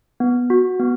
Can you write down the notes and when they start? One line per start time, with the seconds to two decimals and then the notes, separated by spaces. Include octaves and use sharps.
0.20 B3
0.50 F#4
0.80 B3